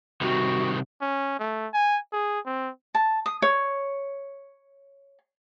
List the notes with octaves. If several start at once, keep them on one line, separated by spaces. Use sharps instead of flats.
C3 D#3 G3 F#4
C#4
A3
G#5
G#4
C4
A5
D#6
C#5